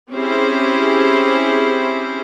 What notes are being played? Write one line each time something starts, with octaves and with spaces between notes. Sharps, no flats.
C4 C#4 E4 G4 G#4 C5